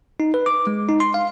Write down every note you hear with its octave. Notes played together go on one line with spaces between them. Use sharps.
D#4
B4
D6
G#3
D#4
C6
F5